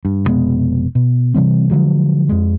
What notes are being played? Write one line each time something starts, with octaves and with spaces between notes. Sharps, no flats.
G2
F1 B2 G#3 B3
B2
C3 E3 G3 C4
D3 F3 F#3 G#3
F2 G#3